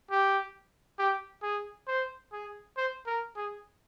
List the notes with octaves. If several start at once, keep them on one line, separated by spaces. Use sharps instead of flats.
G4
G4
G#4
C5
G#4
C5
A#4
G#4